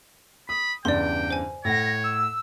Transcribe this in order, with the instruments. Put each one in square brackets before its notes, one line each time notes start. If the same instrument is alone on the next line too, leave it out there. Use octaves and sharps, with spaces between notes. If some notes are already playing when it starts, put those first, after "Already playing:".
[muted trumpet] B5 [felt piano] D#6
[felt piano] E2 G2 C#3 [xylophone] D5 C6 [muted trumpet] G5
[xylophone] C5 G#5
[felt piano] A2 F#5 [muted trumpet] C#5 [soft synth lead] A#6
[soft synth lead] E6